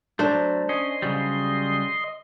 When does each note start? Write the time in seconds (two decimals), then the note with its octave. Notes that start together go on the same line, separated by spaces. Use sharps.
0.19 F#3 A3 D4 C5
0.69 C#4 D#5 C6
1.02 C#3 F#3 G3